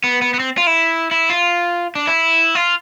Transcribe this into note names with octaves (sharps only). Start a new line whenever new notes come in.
B3
B3
B3
C4
F4
E4
E4
F4
D4
E4
F4